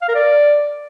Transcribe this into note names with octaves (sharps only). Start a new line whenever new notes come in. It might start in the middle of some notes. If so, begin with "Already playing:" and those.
F5
A#4
D5